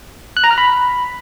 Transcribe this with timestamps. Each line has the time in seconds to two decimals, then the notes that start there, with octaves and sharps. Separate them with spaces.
0.37 F#6
0.44 A#5
0.51 F6
0.58 B5